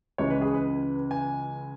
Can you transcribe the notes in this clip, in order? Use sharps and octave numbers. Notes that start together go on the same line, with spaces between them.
C#2 C#3 E3 G#3 C#5
B4
G#4
B4
G#5